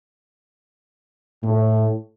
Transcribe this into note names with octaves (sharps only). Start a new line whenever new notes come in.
A2